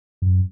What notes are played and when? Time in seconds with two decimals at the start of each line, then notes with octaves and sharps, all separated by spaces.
0.22 F#2